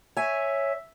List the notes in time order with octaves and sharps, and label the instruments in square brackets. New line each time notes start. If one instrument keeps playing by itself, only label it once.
[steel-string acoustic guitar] C#5 G#5 [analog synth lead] E5